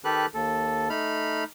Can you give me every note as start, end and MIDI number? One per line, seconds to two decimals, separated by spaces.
0.04 0.26 51
0.04 0.26 67
0.04 0.26 69
0.04 0.26 71
0.04 0.26 90
0.34 0.89 39
0.34 0.89 69
0.90 1.44 57
0.90 1.44 63
0.90 1.44 83
0.90 1.44 89